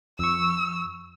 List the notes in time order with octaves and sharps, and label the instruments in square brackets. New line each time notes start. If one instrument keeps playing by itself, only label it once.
[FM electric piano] F2 C#6 [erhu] E6